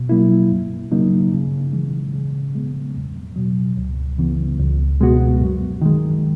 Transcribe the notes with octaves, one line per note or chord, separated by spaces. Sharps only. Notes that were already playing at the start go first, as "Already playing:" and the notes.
Already playing: B2
F#3 A#3 E4
F#2
C#3 F#3 A#3 D#4
C#3
E3 G#3
C#3
G#3 B3
E2
B2 F#3
C#2
C#3 E3 B3
C#2
B2 G#3 B3 F#4
F#2
D#3 G#3